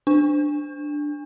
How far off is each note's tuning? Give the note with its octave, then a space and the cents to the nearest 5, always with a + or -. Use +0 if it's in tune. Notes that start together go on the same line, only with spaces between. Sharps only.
D4 +5